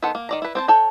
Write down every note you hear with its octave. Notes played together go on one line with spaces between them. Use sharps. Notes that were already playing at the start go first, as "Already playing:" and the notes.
D#3 B3 A4 C5 F#5
A#3
D#3 D5 A#5
E4 B4
C4 C5 A5
A4 C#5 G5